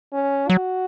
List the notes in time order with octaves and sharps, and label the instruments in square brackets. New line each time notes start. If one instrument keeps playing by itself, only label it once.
[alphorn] C#4
[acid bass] F#3 [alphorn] F#4